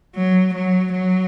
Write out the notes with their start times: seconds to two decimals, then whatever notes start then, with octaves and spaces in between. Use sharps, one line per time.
0.16 F#3
0.54 F#3
0.92 F#3